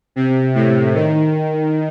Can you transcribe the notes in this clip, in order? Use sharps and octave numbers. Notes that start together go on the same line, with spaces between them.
C3
A2
D#3